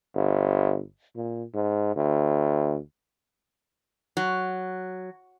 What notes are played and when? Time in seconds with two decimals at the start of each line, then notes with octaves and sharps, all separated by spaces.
0.16 G1
1.16 A#2
1.54 G#2
1.96 D2
4.17 F#3